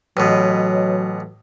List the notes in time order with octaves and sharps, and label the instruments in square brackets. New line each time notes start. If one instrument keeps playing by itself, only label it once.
[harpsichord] A1 B2 [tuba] F#3 [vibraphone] B4 C#5 D#5